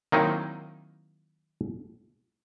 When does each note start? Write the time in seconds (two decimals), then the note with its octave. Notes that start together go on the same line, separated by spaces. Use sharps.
0.12 D#3 F#3 A#3 C4 D#4 E4